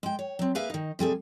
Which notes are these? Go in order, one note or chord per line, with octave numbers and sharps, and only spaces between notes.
G#3 G5
C#5
F#3 C4
A#3 G#4 B4 E5 F5
D#3 D#4
C3 G3 G#4 A4